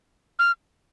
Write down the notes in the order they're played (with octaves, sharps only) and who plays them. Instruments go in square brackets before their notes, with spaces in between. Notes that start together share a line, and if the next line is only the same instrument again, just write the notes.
[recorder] F6